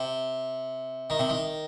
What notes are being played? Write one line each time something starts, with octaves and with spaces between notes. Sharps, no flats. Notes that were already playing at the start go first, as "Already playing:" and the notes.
Already playing: C3
D#3
C3
D#3